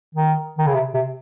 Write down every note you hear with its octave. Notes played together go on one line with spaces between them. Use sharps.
D#3
D#3
C#3
C3
C3